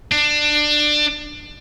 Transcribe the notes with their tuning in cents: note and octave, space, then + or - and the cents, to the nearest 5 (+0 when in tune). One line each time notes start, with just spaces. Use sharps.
D4 +20